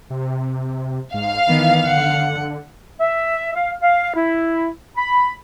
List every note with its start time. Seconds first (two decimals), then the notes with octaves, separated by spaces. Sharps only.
0.10 C3
1.14 G#2 F5
1.48 D#3 E3 B3
1.87 D3 F#5
3.00 E5
3.55 F5
3.82 F5
4.15 E4
4.97 B5